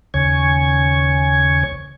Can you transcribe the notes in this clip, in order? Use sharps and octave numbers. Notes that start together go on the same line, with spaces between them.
D#2 C#3 C#5 G#5 C#6 G#6